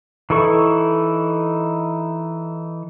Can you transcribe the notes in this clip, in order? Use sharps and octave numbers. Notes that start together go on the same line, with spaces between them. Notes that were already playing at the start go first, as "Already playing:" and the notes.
E3 D#4 E4 A4 C#6